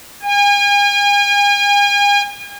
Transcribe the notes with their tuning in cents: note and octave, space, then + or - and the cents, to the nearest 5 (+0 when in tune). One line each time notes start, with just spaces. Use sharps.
G#5 -40